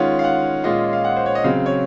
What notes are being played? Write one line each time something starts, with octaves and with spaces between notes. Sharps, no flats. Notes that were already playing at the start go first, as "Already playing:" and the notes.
Already playing: D#3 G#3 C#4 F4 F#5
F5
F#5
A#2 G#3 C#4 F4 D#5
F5
F#5
C5
C#5
D#5
C#3 F#3 C4 F5
C#5